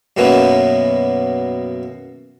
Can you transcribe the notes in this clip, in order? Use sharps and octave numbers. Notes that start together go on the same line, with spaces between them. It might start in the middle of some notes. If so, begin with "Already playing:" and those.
F#2 B2 A#3 B3 C#4 E4